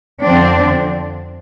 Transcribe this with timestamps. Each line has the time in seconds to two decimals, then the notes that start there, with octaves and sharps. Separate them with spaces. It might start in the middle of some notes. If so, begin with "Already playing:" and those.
0.23 F2 D3 F3 C4 D4